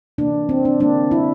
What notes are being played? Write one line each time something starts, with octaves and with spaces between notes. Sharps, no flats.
C3 E3 A#3 D4
C4
D4
D3 G3 A#3 D4
E4